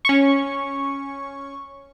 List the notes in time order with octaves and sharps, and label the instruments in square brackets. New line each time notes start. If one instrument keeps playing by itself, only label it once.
[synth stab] C#4 C#6